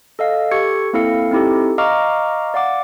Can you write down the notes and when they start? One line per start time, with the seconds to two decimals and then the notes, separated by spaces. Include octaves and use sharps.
0.19 A4 D#5 F5
0.51 G4 A4 C#6 G#6 C#7
0.93 A#3 C4 E4 A4 F5 C#7
1.31 C4 D#4 E4 G4 A4
1.78 D#5 F5 A#5 C#6 D6 F6
2.54 D5 F5 F#5 D6